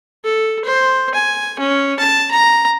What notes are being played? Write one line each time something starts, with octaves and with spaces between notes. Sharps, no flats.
A4
C5
G#5
C#4
A5
A#5